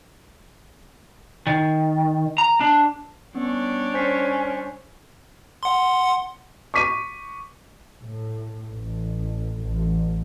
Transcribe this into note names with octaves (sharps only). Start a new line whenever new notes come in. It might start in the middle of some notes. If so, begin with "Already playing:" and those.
D#3
A#5
D4
G3 B3 C#4 D4 C#5
C#4 C5 B6 C7
F#5 C6
C#6 D6 B6 D#7
A2
A1
A1